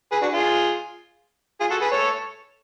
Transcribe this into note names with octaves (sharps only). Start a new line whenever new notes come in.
G#4 B4
D4 F#4
F4 G#4
F4 G#4
F#4 A4
G#4 B4
A4 C#5